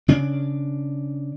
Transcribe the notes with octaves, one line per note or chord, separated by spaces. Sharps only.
C#3 D4